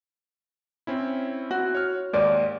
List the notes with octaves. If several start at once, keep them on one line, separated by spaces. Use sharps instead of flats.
C4 C#4 E4
F#4
C#5 F6
D#2 G#2 D5